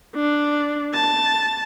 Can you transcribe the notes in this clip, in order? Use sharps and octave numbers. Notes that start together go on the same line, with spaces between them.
D4
A5